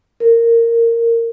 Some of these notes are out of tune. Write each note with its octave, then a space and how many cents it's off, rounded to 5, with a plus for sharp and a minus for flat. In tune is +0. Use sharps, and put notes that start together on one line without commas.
A#4 -15